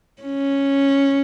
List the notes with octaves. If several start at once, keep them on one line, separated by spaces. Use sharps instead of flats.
C#4